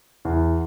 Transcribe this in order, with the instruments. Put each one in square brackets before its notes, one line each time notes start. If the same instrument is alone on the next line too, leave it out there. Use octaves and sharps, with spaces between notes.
[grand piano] E2